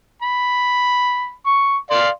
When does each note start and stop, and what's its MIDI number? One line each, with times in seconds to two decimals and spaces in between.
0.22 1.33 83
1.46 1.77 85
1.90 2.09 74
1.90 2.09 77
1.90 2.09 84